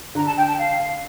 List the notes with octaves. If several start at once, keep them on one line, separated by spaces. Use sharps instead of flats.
D3 A#5
A5
G5
A5
F5